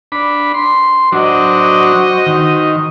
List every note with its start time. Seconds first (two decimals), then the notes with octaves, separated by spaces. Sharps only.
0.12 D4 B5
0.54 C6
1.12 F#3 D4 F#4 C5 D#5
2.26 D#3